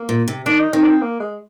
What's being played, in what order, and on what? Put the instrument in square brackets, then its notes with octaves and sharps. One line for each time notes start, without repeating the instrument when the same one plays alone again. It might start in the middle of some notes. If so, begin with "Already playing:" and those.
Already playing: [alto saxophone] A#3
[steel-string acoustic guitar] A#2
C3
[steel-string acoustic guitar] D#3 [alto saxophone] D4
[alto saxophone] D#4
[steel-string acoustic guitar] D#3 [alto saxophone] C4
[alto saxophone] D4
C4
A#3
G#3